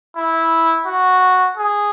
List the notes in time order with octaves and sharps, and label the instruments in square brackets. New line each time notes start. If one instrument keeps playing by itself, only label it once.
[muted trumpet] E4
F#4
G#4